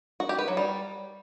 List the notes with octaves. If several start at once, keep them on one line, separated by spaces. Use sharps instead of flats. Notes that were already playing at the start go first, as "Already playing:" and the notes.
F#4
G4
B4
F#3
G3